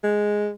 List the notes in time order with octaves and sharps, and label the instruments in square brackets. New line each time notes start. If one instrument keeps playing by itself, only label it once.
[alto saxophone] G#3